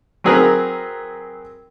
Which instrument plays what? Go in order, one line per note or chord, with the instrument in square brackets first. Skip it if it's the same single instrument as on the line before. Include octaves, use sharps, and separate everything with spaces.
[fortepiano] F#3 C4 G#4 A#4 B4 A#5